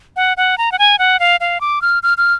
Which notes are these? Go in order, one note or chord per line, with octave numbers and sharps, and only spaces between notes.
F#5
F#5
A#5
F#5
G#5
F#5
F5
F5
D6
F6
F6
F6